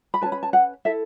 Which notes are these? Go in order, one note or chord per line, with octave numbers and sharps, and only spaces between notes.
B5
C#4 F#4 B4 A5
B5
A5
F#5
E4 A4 E5